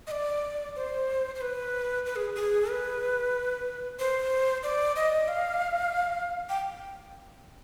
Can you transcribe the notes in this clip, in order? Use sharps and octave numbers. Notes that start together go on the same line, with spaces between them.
D#5
D5
C5
C5
B4
B4
G#4
G#4
B4
C5
D5
D#5
F5
G5